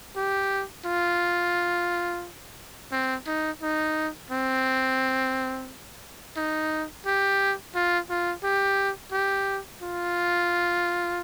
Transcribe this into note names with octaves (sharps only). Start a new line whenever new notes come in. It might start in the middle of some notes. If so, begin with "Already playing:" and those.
G4
F4
C4
D#4
D#4
C4
D#4
G4
F4
F4
G4
G4
F4